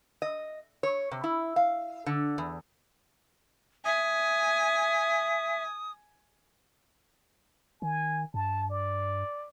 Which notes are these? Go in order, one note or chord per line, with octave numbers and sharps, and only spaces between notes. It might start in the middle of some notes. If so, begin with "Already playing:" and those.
D#5
C#5
C3
E4
F5
D3
E2
E5 G#5 D#6
D#3 G#5
G2 A5
D5